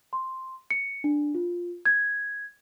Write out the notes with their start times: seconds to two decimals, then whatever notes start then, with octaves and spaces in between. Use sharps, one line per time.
0.13 C6
0.70 C#7
1.04 D4
1.35 F4
1.85 G#6